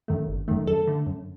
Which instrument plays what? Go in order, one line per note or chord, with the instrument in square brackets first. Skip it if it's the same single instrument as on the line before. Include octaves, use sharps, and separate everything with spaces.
[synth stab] F#2 D#3 A3
G1
F#2 D#3 A3
F#2 A4
D3 A3
F#2